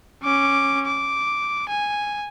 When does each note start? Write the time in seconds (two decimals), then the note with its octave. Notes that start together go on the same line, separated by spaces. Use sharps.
0.23 C#4 D6
0.86 D6
1.69 G#5